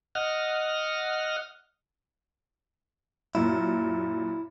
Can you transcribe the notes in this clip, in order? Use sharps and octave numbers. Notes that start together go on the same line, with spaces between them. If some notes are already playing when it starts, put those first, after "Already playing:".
D#5 F#5 F6
F#2 A#2 E4